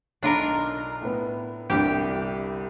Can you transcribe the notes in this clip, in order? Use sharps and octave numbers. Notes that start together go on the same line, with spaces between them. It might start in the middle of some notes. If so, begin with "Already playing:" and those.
B1 D4 F4 A#4 A#5 B5
A2 B3
G1 C2 G2 G4